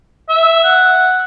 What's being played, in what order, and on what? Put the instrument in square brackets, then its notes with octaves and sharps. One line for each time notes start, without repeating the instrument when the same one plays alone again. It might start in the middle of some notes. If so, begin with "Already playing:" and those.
[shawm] E5
F#5